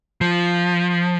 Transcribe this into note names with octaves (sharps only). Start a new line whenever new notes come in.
F3